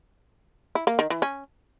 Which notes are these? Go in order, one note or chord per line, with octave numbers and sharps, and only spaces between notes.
E4
A#3
D#3
E3
C#4